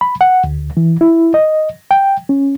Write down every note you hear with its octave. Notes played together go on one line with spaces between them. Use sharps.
B5
F#5
D2
E3
E4
D#5
G5
C#4